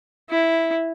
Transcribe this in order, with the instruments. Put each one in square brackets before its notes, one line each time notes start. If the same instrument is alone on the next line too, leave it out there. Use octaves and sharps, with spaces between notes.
[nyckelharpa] E4